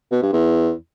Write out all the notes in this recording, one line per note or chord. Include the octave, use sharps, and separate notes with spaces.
B2
G2
E2